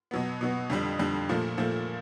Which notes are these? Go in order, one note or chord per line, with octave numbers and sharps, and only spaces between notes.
B2 F#3 B3
B2 F#3 B3
F2 D3 G3
F2 D3 G3
A#2 F3 A3
A#2 F3 A3